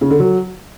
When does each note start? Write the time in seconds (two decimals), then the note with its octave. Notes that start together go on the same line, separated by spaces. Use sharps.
0.01 C#3
0.10 D3
0.20 F#3